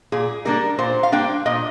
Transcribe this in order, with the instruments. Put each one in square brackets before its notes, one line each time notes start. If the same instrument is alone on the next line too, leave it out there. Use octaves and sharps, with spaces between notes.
[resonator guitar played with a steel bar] A#2 G#4
G3 A#3 D4 A#4
A#2 C5
F5
G3 A#3 D4 G5
A#2 D#5